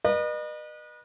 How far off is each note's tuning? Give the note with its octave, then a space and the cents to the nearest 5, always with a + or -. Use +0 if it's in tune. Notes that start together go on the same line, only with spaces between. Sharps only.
B4 -35 D#5 -40